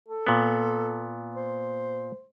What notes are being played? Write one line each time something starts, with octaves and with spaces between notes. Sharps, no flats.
A4
A#2 B3
C5